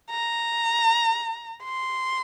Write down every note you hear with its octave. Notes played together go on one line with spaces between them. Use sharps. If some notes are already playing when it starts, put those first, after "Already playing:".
A#5
C6